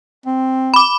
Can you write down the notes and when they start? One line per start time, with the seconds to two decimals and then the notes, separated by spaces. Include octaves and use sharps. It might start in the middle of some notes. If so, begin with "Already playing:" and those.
0.26 C4
0.74 B5 D6